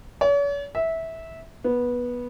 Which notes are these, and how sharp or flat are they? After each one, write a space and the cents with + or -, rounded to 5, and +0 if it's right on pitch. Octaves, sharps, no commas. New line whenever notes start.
C#5 +45
E5 -15
B3 -15